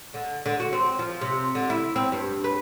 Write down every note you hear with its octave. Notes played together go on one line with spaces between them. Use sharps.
D3
D3
F#4
C4
F3
C3
D3
E4
C4
G2
B4